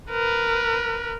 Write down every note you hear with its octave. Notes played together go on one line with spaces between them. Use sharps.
A#4 B4